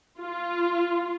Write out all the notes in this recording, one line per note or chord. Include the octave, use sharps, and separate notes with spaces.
F4